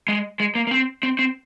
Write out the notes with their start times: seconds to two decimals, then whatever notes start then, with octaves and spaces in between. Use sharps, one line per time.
0.08 G#3
0.40 G#3
0.55 A#3
0.67 A#3
0.71 C4
1.03 C4
1.19 C4